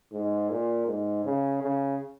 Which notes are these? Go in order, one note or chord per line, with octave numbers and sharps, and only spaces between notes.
G#2
A#2
G#2
C#3
C#3